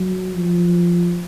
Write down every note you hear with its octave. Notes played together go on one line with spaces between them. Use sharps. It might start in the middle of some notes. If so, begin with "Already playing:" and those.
Already playing: F#3
F3